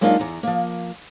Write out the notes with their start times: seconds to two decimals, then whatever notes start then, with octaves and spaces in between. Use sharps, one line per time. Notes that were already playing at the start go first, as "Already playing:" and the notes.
0.01 F#3 G#3 A#3 D4 D#4 F4
0.20 E2 A#5
0.43 F3 A#3